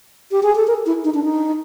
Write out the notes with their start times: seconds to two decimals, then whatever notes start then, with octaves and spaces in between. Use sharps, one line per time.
0.31 G4
0.43 G#4
0.55 A4
0.67 A#4
0.86 E4
1.04 D#4
1.14 D4
1.23 D#4